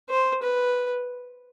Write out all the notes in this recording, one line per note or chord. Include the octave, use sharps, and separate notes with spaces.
C5
B4